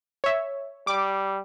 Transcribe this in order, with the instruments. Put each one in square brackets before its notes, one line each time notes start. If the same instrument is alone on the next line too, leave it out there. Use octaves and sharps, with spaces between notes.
[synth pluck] C#5 E5
[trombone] G3 [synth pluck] D6